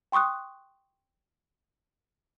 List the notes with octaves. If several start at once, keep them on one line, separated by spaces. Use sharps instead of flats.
G5 C6 C#6 D#6 F#6